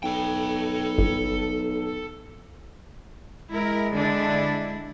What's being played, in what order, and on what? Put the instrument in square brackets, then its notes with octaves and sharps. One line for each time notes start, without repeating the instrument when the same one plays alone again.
[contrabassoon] B1 [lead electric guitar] A4 G5
[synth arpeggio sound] G1
[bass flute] G#3 [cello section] E4 A#4
[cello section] D3 D4 E4